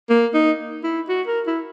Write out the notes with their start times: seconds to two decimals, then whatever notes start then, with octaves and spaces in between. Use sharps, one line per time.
0.10 A#3
0.34 D#4
0.84 E4
1.09 F#4
1.27 A#4
1.47 E4